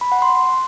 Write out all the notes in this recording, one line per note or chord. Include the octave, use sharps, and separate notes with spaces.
B5
F#5
C6